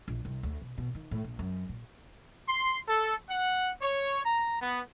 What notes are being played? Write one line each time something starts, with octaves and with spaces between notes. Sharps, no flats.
A#1
C2
D2
B2
B2
D#3
A2
A#1
F#2
A#2
C6
A4
F#5
C#5
A#5
B3